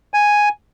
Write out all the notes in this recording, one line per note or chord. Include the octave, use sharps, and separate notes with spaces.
G#5